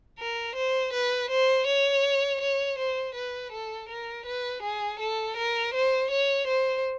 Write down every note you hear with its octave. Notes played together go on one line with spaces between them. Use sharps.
A#4
C5
B4
C5
C#5
C#5
C5
B4
A4
A#4
B4
G#4
A4
A#4
C5
C#5
C5